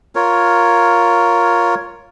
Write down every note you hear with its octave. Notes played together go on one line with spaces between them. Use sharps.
F4 A#4 C#5